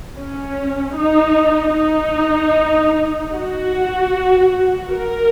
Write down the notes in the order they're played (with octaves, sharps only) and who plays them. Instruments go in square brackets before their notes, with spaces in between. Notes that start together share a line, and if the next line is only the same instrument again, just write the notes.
[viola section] C#4
D#4
D#4
F#4
A#4